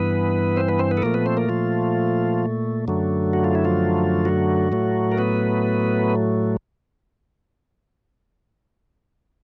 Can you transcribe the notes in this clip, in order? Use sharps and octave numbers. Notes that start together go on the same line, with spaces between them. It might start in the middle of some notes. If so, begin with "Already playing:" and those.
Already playing: G2 E3 B3 B4
C4 C5
B3 B4
C4 C5
B3 B4
A4
A#2 F3 A3 A#3 A#4
B3 B4
C4 C5
A#3 A#4
F3 F4
F#2 D3 F#3 A3
F#4
F4
E4
F3 F4
F#3 F#4
A2 F#3 A3
A#4
B3 B4